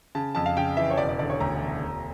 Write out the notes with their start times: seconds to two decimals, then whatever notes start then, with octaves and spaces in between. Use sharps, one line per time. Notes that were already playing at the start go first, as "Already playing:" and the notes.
0.15 C#3 A5
0.35 F2 A5
0.46 F5
0.57 C#3 G5
0.77 E3 E5
0.90 C#5
0.97 E1 D5
1.09 D5
1.19 D3 D5
1.30 C#5
1.40 D2 A#5
1.61 E1
1.81 E1